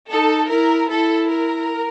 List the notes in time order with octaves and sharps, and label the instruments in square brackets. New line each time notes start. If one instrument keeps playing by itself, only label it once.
[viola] D#4 [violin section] A4
[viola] E4 [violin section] A#4
[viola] E4 [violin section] A4
[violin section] A#4